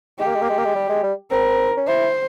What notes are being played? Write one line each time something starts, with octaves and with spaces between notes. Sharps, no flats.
G#3 G4
A#3
G#3
A#3
G#3
A#3
G#3
G3
G#3
G3
C4 A#4
C#4
E4 C5